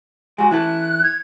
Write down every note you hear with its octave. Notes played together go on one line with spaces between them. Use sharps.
G#3 F#4 G#5
E3 E4 A4 F#6
G#6